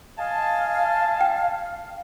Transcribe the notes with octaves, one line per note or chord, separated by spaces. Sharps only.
D#5 F5 G#5 A5
G5